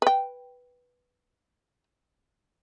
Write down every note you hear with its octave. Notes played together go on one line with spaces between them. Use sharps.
B4 G5